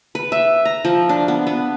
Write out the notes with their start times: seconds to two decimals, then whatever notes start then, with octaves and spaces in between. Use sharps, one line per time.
0.15 B4
0.32 E5
0.65 A#5
0.85 F3
1.09 D4
1.28 B3
1.47 B3